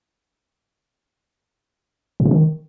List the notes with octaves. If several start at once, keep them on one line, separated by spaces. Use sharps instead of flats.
A2
C3
D#3